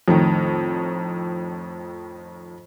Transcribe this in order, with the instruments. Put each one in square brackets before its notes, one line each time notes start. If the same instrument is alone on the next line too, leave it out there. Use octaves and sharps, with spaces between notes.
[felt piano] F2 A2 D#3